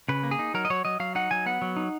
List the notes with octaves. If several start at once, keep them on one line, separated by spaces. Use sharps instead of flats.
C#3 B4
A#3
G#4
D#4
F#3 A#4
D#5
F#3 C#5
F#3 D#5
F#3 F5
D#4 F#5
F#3 G#5
B3 F#5
F#3
D#4